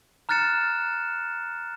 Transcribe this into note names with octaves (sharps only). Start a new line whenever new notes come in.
A#5 F6 F#6 A6 C#7 E7